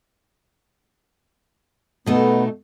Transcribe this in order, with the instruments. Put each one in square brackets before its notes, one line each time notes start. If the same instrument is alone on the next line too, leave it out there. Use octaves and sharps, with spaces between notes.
[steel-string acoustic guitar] B2 A3 D#4 [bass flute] B3